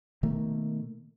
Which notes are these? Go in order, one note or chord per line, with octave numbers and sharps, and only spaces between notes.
B2 D#3 A3 A#3